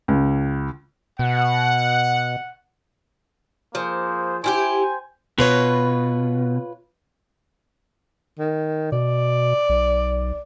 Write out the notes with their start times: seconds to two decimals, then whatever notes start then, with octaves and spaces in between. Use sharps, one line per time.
0.08 C#2
1.19 B2 F#5
3.75 F3 A#3 G#4 C5
4.44 E4 F4 G4 C5 G5 G#5
5.38 B2 F4 B4 C#5
8.38 D#3
8.92 B2 D5
9.69 B1